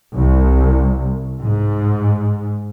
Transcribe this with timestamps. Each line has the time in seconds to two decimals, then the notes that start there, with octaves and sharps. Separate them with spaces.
0.16 C2
1.42 G#2